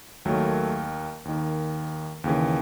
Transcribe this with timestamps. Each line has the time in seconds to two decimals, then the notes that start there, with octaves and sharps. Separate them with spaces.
0.25 D#2 D#3 F#3 A3
1.25 D#2 D#3
2.24 D#2 C#3 E3